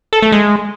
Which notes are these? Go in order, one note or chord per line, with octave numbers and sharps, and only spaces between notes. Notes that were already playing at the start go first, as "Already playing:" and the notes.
A4
A3
G#3